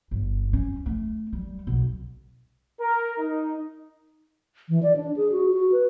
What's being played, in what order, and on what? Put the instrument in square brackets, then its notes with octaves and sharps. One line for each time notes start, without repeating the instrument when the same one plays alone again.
[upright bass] G1
C#4
A3
G3
B1
[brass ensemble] A#4
D#4
[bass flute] E3
D5
D4
G#4
F#4
F#4
B4